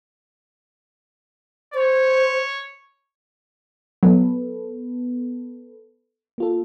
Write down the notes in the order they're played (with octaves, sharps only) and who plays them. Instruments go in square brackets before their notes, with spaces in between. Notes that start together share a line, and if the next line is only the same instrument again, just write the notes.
[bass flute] C5 [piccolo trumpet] C#5
[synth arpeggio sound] F#3 [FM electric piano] B3 A4 B4
[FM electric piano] A#3 F4 A4